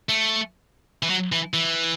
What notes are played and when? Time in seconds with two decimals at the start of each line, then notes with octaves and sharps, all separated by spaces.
0.09 A3
1.03 E3
1.10 F#3
1.32 E3
1.54 E3